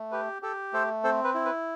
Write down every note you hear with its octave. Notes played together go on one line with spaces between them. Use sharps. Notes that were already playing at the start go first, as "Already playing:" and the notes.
Already playing: A3
G4 B4
G4 A4
A3 A4 C5
C4 A4 C5
B4
E4
B4